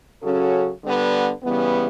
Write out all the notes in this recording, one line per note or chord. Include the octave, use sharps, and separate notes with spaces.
C#3 F#3 C#4 F#4 A4
D3 G3 B3
C#3 E3 G3 B3